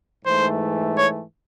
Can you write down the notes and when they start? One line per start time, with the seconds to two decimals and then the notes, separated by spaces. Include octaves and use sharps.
0.24 G#2 E3 A3 C5
0.96 C#5